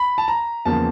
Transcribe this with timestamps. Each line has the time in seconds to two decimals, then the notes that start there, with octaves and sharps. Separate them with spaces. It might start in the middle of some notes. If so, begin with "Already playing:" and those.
Already playing: B5
0.18 A5
0.28 A#5
0.65 E2 C#3 F3 A#3 A5